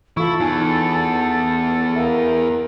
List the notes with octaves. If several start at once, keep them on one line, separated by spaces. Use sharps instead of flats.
E3 E4 F4 A4 C#6
E2 D#4 G#5 C#6
A#4 E5 F5